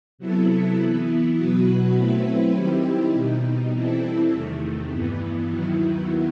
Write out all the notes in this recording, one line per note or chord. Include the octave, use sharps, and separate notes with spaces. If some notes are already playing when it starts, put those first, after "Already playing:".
C3 F#3 B3 E4 A4
E3 B3 E4
B2 F#3 B3 F#4 B4
F#3 A3 C4 E4 B4
D#3 G3 C4 E4 G4
B2 G3 D#4
E3 G3 C4 E4 A4
E2 C3 D#3 A3
G2 E3 B3
D#2 D#3 F#3 B3 E4